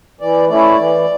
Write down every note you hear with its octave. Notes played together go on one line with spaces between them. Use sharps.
E3 D5
A3 C#4 E4 D5
E3